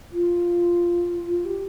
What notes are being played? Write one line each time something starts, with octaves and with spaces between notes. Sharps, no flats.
F4
F4
G4